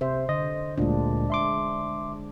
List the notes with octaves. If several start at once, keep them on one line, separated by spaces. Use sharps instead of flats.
C3 C5 E5
D3 D#5
D2 A#2 G#3 D4
E5 C6 D6